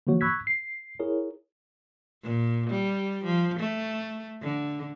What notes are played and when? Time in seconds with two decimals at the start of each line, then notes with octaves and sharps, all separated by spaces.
0.07 D3 E3 F3 A#3 F#4 C#5
0.21 B5 C#6 E6 F#6 G#6 B6
0.47 C7
1.00 E4 G#4 A#4 C#5
2.23 A#2
2.70 G3
3.24 F3
3.60 A3
4.42 D3